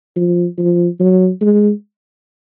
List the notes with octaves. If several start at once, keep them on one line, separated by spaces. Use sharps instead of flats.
F3
F3
F#3
G#3